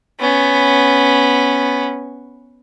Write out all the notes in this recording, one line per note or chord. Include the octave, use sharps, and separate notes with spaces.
B3 C#4